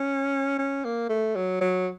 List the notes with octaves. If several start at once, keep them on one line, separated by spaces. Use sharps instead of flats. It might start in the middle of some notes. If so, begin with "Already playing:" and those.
Already playing: C#4
C#4
A#3
A3
F#3
F#3